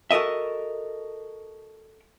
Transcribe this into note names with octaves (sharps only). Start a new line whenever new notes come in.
F#4 A4 A#4 D#5 E5